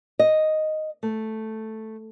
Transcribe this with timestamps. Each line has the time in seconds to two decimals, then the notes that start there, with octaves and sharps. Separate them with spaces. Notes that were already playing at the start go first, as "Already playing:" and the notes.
0.19 D#5
1.03 A3